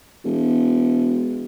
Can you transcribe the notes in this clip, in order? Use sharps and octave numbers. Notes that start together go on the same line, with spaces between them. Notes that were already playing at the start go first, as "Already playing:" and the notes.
E1